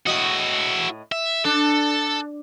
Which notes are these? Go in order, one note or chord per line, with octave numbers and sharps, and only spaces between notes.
A2 E4 F#4 D#5
E5
D4 A4